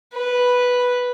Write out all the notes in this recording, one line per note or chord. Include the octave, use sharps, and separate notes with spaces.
B4